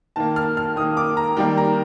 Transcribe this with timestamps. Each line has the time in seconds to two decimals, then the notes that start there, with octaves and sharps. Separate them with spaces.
0.16 D#3 A#3 A5
0.36 F6
0.57 F6
0.76 D#3 A#3 D#6
0.97 D6
1.17 A#5
1.37 D#3 G3 A#3 G5
1.57 A#5